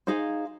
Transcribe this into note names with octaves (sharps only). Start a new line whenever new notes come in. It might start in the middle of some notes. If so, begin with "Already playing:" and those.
D#4 G#4 C5 F5